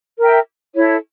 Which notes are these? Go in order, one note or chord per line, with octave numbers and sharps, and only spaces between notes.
A#4 E5 G5
E4 A4 C#5